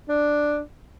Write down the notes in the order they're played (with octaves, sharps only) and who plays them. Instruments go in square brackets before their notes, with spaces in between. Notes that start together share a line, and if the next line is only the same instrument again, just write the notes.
[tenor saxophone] D4